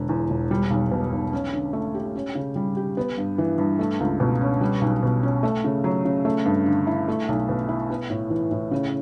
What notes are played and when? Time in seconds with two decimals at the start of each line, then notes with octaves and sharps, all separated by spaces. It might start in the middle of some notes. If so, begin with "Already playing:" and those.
Already playing: E1 D3
0.09 E2
0.30 E1
0.51 G3
0.70 B1
0.92 B2
1.12 B1
1.33 C#4
1.53 D3
1.73 A3
1.95 G4
2.15 C#4
2.35 C#3
2.56 G3
2.77 G4
2.97 B3
3.18 G2
3.38 E3
3.58 G2
3.79 A3
4.00 C#2
4.20 B2
4.41 C#4
4.61 G3
4.81 B1
5.03 B2
5.23 C#4
5.43 A3
5.64 C#3
5.84 F#3
6.05 C#3
6.25 A3
6.45 G2
6.66 D3
6.87 E4
7.08 A3
7.28 B1
7.49 B2
7.69 E4
7.90 B3
8.10 A2
8.30 E3
8.51 A2
8.71 C#3